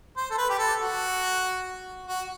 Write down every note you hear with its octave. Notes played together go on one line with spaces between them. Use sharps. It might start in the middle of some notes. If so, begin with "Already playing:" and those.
C5
A4
B4
G4
A4
F#4
F#4